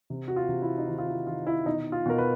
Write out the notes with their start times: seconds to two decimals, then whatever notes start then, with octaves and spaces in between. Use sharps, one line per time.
0.10 C3
0.28 F#4
0.36 F4
0.49 C3
0.62 E4
0.78 D#4
0.88 D#3 E4
0.98 F4
1.08 E4
1.27 D#3 F4
1.47 E4
1.66 B2 D#4
1.92 F4
2.06 B2 A#4
2.18 B4